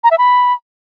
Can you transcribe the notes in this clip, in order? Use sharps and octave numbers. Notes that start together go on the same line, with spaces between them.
A#5
E5
B5